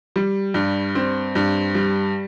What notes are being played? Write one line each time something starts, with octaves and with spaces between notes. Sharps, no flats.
G3
G2
C4
G2
G3